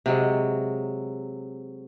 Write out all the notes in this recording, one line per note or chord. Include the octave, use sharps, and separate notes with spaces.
C3 F#3 G#3